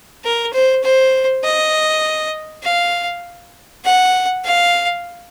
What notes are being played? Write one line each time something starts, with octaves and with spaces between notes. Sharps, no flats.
A#4
C5
C5
D#5
F5
F#5
F5